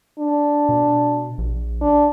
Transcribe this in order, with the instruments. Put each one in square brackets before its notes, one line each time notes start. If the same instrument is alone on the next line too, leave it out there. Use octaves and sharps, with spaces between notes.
[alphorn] D4
[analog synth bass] B2
A#1
[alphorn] D4